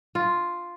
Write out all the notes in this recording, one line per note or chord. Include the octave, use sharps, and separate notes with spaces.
F4